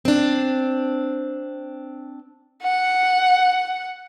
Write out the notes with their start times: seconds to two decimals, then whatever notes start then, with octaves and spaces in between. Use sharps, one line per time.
0.05 C4 D4
2.63 F#5